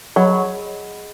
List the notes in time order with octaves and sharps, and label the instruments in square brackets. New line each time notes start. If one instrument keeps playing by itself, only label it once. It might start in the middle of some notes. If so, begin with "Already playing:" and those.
[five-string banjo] F#3 [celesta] G#4 D#5 F#5 B5